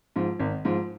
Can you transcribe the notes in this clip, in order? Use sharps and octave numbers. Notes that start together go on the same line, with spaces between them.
G#2 F3
G#1
G#2 F3